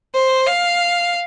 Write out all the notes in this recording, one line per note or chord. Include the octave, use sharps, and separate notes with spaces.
C5
F5